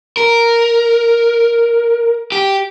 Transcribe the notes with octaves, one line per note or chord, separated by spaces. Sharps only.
A#4
G4